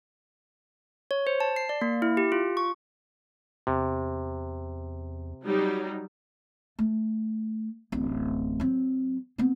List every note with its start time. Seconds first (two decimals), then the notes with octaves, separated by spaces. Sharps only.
1.11 C#5
1.27 C5
1.40 A5
1.56 C7
1.69 D5
1.81 A#3
2.02 E4
2.17 G4
2.32 F4
2.57 C#6
3.67 E2 C3
5.47 F#3 G3 D#4
6.79 A3
7.92 D1 A1
8.60 F#3 C4
9.38 B3 C4